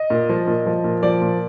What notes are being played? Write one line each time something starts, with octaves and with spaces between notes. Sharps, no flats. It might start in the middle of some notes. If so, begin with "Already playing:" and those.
Already playing: D#5
A#2
F3
A#2
F3
A#2
F3 D5
A#2